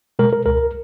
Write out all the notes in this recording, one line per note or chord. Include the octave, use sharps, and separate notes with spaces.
B2 G#3 A#4
A#4
C#2 A#4